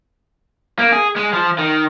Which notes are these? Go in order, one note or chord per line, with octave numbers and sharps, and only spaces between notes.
A#3
G#4
G#3
F3
D#3